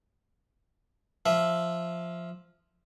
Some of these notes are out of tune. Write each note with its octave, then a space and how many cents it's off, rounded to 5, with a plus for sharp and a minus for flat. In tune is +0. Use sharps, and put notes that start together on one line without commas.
F3 +0 E5 +0